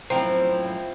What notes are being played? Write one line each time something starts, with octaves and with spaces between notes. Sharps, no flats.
F#2 A2 F3 C4 E4 A#4 C5